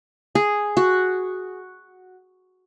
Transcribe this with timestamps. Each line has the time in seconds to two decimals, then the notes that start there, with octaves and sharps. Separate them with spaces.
0.35 G#4
0.77 F#4